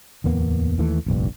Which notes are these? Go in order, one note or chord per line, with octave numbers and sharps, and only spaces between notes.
D1 E2 A#3 B3
D#2 E3 A3
F1 A#1 G2